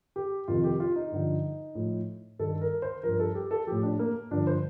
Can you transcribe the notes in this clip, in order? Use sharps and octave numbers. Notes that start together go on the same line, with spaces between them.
G4
F2 C3 D#3 F4
G4
F4
D#4
G2 D3 F3
A2 F3
G2 D#3 A4
A#4
C5
G2 F3 A#4
A4
G4
A4
A2 F3 G4
D4
A#3
G2 D3 F3 D4
C5